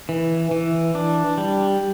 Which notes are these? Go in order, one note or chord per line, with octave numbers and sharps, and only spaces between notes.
E3
E3
D4
G3